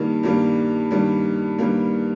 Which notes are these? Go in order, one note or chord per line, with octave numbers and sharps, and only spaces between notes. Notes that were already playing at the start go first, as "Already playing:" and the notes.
Already playing: G2 D#3 G3 A#3
G2 D#3 G3 A#3
G2 D#3 G3 A#3
G2 D#3 G3 A#3